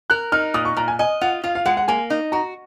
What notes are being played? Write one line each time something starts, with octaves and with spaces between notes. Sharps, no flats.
A#4 F#6
D#4 F6
A#2 D#6
C#6
A#2 A#5
G#5
D#5 G#5
F4 F#5
F4 F5
F5
G#3 F#5
F#5
A#3 G#5
D#4
F#4 A#5